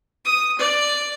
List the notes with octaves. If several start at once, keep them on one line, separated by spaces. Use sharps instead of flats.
D#6
D5